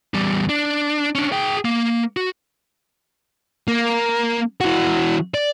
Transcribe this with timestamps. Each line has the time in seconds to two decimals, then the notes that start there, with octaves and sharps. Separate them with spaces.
0.14 E2 G3
0.49 D4
1.15 C#4 D4
1.32 G#4 G5
1.65 A#3
2.17 F#4
3.68 A#3
4.61 E3 F#4
5.34 D5